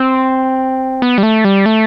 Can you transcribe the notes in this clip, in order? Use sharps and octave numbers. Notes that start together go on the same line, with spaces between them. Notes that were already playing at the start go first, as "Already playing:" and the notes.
Already playing: C4
B3
G3
A3
G3
A3